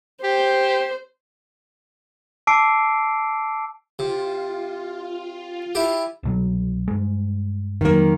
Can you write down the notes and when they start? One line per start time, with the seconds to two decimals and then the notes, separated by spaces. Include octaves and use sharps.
0.24 G4 C5
2.47 A5 D6 E6 C7 D7
3.99 C3 F4
5.75 E4 G4
6.23 C2 B2 F#3
6.88 G2 G#3
7.81 F2 D#3 F#3 A#3